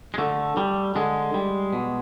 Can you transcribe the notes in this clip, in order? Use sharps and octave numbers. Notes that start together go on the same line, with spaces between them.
G#3
D3 A3
G3
D3 G#3
G3
B2